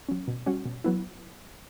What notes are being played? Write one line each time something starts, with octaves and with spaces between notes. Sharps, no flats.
F#3 C#4
B2
G3 C#4 F#4
B2
F#3 B3 E4